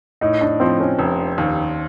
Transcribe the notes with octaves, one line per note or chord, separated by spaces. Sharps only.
A2 D#4
D4
F3 C4
C#4
F1
D#2